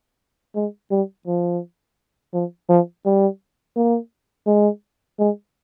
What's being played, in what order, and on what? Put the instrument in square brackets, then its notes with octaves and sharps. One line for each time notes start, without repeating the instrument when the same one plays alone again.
[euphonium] G#3
G3
F3
F3
F3
G3
A#3
G#3
G#3